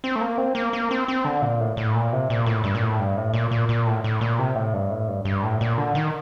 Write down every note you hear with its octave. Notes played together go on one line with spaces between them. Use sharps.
C4
A3
A#3
C4
A#3
A#3
C4
C4
D3
A#2
A2
A2
A#2
C3
A#2
A2
G2
A#2
A2
G2
A2
A#2
A#2
A#2
A2
A2
A#2
C3
A2
G2
A2
G2
G2
A2
A#2
D3
D#3